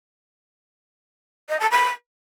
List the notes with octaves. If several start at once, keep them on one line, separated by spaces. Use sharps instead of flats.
D#5
A5
B5